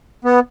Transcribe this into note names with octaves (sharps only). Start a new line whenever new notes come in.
B3